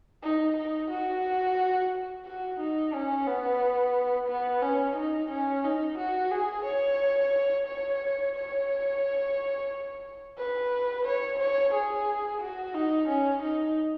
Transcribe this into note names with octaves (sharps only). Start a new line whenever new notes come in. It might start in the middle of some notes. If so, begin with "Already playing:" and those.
D#4
D#4
F#4
F#4
D#4
C#4
B3
B3
C#4
D#4
C#4
D#4
F#4
G#4
C#5
C#5
C#5
B4
C#5
C#5
G#4
F#4
D#4
C#4
D#4